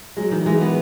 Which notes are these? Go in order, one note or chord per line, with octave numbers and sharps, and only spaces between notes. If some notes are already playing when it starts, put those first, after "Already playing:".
F#3 G#3
D#3 E3
E3 G#3
B3